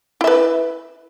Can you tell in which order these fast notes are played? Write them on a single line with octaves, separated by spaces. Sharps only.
E4 E5 B4